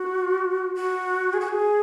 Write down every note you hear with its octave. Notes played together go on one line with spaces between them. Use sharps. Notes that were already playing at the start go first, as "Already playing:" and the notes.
Already playing: F#4
F#4
G#4
F#4
G#4